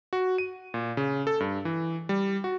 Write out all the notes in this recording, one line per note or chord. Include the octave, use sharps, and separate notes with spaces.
F#4
D#7
A#2
C#3
A4
G2
E3
G3
F#4